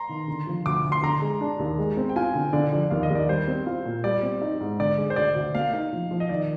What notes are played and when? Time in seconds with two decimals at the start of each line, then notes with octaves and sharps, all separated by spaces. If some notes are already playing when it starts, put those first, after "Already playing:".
Already playing: A#5 C6
0.09 D#3
0.28 D3
0.47 F3
0.66 D2 D6
0.84 D2
0.92 C6
1.03 D3 A#5
1.22 G#3
1.41 D4
1.59 D#2
1.78 G#3
1.97 C4
2.09 G5
2.16 F4 G#5
2.35 D3
2.53 D3 D5
2.72 F3 D5
2.90 D#2 F5
3.03 D#5
3.10 D#2
3.15 D5
3.29 G3 C5
3.48 C4
3.67 F4
3.85 A#2
4.04 G3 D5
4.23 C4
4.42 D#4
4.61 G#2
4.79 D3 D5
4.98 G#3
5.10 C5
5.16 D2 D5
5.36 D2
5.54 A#3 F5
5.73 D#4
5.93 F3
6.11 F3
6.20 D#5
6.29 D#3 D5